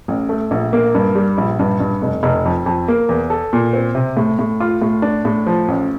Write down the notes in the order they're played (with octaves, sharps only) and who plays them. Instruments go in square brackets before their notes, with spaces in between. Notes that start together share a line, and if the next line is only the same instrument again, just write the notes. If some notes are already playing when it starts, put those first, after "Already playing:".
[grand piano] A1
A3
A#1
A#3
G2
G3
A#1
G2
G2
F1
F1
F2
F2
A#3
E2
A4
A#2
C4
C3
A2
A2
F4
A2
D4
A2
F3
A1